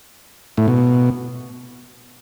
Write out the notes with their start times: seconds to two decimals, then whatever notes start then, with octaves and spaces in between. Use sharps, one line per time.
0.57 A2
0.68 B2